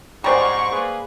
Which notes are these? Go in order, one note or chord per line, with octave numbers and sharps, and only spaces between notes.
G#2 G3 C#4 F#4 C5 D5 A#5 C#6
A#3 G#4 B4